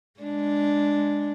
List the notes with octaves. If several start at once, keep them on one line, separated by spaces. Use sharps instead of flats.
G#3 D4